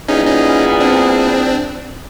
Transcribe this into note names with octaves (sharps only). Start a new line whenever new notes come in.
A#2 G3 B3 C#4 D#4 E4 G#4
C#4 D#4
C4 D4